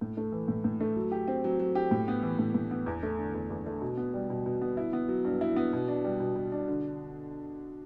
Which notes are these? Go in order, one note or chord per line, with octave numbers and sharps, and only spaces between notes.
A2
A3
E3
A2
A2
A3
F#3
G4
C4
F#3
F#3
G4
A2
B3
E3
A2
A2
B3
E2
A3
D3
E2
E2
A3
B2
B3
G3
B2
B2
B3
E4
B3
F#3
G2
E4
B3
B2
D4
G3
B2
B2
D4
D3